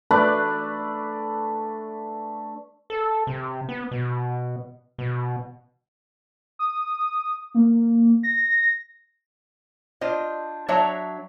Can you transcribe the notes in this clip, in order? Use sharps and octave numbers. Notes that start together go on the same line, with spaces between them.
A3 D4 B4 D5
A4
C3
B3
B2
B2
D#6
A#3
A#6
D4 F4 C5 D#5
F#3 D4 C#5 E5 A5 A#5